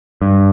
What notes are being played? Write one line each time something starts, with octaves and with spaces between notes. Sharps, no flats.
G2